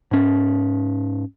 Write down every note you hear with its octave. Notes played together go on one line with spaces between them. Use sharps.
G#2 C#4